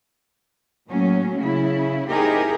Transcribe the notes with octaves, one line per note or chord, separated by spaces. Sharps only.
A2 F#3 A#3 C#4
C#3 E4
C4 D#4 E4 G4 G#4 A#4